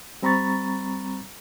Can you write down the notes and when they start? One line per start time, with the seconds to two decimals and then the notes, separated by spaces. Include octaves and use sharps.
0.22 G3 C4 A#5 B5 C#6 A6